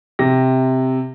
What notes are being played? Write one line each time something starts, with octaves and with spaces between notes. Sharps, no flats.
C3 A#6